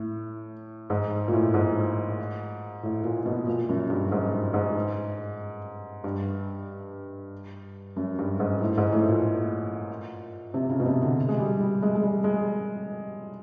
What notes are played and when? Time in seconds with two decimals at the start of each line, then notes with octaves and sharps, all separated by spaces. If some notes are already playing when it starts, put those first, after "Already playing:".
Already playing: A2
0.90 G#2
1.28 A#2
1.33 A2
1.54 G#2
2.83 A2
3.04 A#2
3.26 B2
3.47 A#2
3.69 F#2
3.90 G2
4.12 G#2
4.54 G#2
6.04 G2
7.96 F#2
8.19 G2
8.40 G#2
8.61 A2
8.77 G#2
8.92 A2
9.09 A#2
10.54 C3
10.69 C#3
10.80 B2
10.86 C3
11.02 D3
11.28 G#3
11.39 G3
11.60 G3
11.82 G#3
11.95 G#3
12.03 G3
12.24 G#3